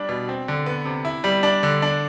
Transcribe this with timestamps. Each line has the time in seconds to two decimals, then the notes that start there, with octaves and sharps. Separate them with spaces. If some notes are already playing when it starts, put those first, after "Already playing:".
Already playing: G3 D4
0.09 B2
0.29 C4
0.48 D3
0.66 B3
0.85 C3
1.05 E4
1.24 G3
1.43 D4
1.63 D3
1.82 D4